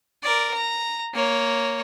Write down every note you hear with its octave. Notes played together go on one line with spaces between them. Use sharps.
A#4 D5
A#5
A#3 C#5